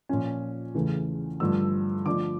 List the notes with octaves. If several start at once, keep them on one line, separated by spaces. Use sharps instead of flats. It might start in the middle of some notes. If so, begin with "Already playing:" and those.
A#2 F3 C#4
E2 C#3 E3 A3
G2 D3 F3 A3 E6
D3 F3 A3 D4 D6